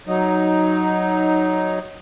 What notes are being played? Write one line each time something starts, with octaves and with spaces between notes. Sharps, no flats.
F#3 D#4